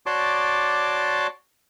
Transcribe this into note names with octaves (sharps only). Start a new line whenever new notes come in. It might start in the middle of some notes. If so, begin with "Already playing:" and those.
F#4 C#5 D5 A5 C6 D6